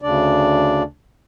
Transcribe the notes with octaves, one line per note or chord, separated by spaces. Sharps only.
D2 C#3 D4 D5